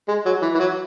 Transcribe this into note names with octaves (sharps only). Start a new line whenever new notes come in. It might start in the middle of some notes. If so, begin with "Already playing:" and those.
G#3
F#3
E3
E3
F#3